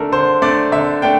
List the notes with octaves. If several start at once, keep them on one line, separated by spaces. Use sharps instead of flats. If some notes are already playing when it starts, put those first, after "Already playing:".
Already playing: D3 A3 D4 A4 A#4
D3 C5
A3 D4 D5
D3 E5
A3 D4 G5